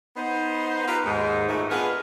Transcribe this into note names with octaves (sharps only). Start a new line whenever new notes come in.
B3 D#4 C5
F4 G4 A#4 B4
D#2 G#2
A#2 D#3 E3 G#3 A3
B3 D4 F4 G#4 A#4 B4